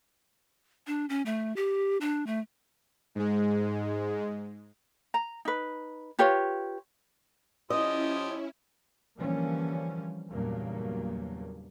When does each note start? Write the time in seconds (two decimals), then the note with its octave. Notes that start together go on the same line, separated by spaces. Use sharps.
0.87 D4
1.09 C#4
1.26 A3
1.56 G4
2.01 D4
2.27 A3
3.15 G#2 G#3
5.14 A#5
5.45 D#4 B4
6.19 F4 G4 B4 C#5
7.70 F3 C#4 E4 G4 D#5 D#6
9.18 D3 E3 F3 G3 A#3 C#4
10.29 E2 G2 A#2 C#3 F#3 A#3